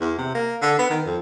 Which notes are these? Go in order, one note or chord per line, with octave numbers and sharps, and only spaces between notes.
E2
C3
A#3
D3
B3
D#3
F2